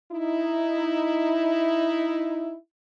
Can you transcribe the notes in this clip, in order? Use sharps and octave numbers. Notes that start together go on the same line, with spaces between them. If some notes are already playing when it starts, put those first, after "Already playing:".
D#4 E4